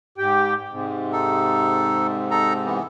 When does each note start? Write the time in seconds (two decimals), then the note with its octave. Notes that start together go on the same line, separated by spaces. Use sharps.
0.18 G#2 G4 G5
0.69 G#2 C3
1.12 D#4 A4
2.31 D#4 A4 A#5
2.66 E3 B3